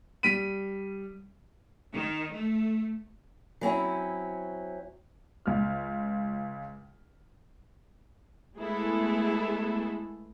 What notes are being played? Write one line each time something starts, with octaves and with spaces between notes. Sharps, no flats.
G3 B6 D7 D#7
D#3
A3
F#3 C4 C#4 E4
C#2 F6
G#3 A3 B3 E4 G#4 A4